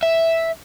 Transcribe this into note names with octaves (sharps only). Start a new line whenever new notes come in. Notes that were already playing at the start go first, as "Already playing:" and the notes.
E5